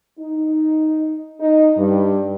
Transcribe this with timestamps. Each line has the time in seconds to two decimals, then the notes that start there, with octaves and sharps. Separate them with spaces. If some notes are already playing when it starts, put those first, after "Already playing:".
0.18 D#4
1.39 D#4
1.77 G2